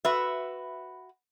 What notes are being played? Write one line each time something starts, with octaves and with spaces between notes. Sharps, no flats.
F#4 B4 E5